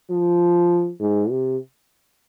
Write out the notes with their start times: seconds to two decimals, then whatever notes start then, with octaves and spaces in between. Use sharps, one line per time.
0.11 F3
1.00 G#2
1.30 C3